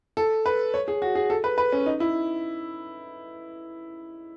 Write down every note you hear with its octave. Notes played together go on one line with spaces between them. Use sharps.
A4
B4
C#5
G#4
F#4
G#4
A4
B4
B4
C#4
D#4
E4